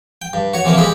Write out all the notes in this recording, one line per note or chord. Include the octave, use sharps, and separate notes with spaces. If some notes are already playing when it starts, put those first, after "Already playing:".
G5
G2
F#4 C#5
C3 E3 F3 A#3 C4 E4
G#3 C4 G4 G#4 B5